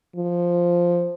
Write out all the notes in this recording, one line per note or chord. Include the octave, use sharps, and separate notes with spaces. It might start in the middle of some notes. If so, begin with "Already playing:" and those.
F3